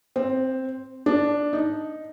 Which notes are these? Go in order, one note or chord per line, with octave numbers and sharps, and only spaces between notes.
C4
D4
D#4